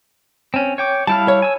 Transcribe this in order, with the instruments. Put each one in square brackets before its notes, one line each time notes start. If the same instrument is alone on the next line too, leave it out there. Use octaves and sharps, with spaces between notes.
[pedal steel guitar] C4 C#4
C#5 G5 D6
[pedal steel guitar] G3 E4 F5 [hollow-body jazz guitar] A5
[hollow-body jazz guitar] C#5
[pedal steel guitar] G#5 E6